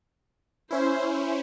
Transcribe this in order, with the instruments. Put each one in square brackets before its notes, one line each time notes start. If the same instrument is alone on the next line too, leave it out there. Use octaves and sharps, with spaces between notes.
[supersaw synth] C#4 E4 [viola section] C5